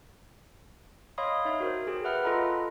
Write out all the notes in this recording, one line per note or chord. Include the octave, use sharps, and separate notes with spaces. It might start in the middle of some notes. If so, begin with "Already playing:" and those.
C#5 D#5 F5 B5 C6 D#6
D#4 C#5 E5
F#4 A#4 C5
G4 G#4
B4 E5 F#5 B5 F6 F#6
F4 A4 D#5 A#5 B5